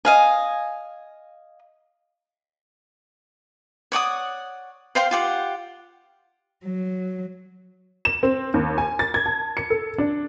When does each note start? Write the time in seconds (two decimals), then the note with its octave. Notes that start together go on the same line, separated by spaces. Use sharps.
0.05 D#5 F5 G#5
3.92 C#5 D5 F#5 D#6
4.95 C5 F5 G5 C6
5.11 F4 G4 F#5
6.65 F#3
8.05 E7
8.23 C4
8.54 D#2
8.78 G#5
8.99 A6
9.14 G#6
9.26 A5
9.57 C#7
9.70 A4
9.98 D4